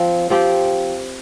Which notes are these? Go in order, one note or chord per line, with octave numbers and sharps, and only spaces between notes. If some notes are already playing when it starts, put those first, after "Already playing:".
Already playing: F3 C4
F3 C4 G4